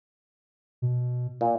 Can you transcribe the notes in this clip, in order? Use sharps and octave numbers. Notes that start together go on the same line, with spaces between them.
B2
A#2